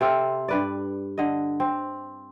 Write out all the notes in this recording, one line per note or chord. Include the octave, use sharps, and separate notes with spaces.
C3 C4 A4 F5
G2 B4 D5
D3 D#5
C4